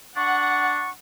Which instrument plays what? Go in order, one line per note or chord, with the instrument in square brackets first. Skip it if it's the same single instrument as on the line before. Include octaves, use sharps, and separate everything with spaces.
[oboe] D4 [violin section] F#5 [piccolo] C#6